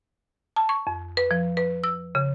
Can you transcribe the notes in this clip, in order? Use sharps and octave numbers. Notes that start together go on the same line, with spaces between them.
A5
C#6
F2
B4
F3
B4
E6
C#3